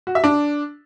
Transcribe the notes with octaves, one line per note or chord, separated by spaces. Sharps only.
F#4
E5
D4